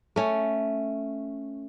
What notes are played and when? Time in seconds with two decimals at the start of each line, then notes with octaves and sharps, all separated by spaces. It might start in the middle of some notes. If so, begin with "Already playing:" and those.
0.16 A3 C#4